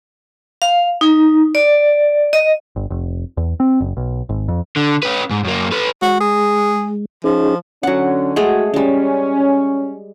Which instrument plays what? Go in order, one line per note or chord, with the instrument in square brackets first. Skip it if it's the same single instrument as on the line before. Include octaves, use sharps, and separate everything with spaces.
[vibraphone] F5
D#4
D5
D#5
[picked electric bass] G1
F1
E2
C4
F#1
B1
G#1
F2
[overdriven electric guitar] D3
C#4 B4
G#2
F#2 A#3
A4 B4
[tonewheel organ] G#3 [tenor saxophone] F#4
[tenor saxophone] G#4
[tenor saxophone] F3 [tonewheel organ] C#4 D#4 G#4
[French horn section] D3 C#4 [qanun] F#3 F#5
[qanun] G#3 A3 G#4 [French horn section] F#4
[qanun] G3 G#3 [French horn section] C#4